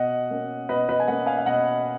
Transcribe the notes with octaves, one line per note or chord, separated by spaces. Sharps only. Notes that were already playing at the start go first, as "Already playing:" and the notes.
Already playing: B2 D#5 F#5
A#3 C#4
B2 B4 D#5
B4 D#5
G#5
A#3 C#4 D#5 F#5
F5 G#5
F5
B2 D#5 F#5